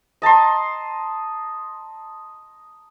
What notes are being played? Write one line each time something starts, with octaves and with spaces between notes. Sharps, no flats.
D#5 A5 A#5 C6